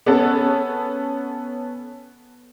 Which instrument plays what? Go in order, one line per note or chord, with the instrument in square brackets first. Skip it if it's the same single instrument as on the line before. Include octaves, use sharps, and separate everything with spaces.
[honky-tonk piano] B3 C#4 A4